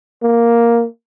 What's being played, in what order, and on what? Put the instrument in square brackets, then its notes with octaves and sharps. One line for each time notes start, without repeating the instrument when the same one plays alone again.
[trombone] A#3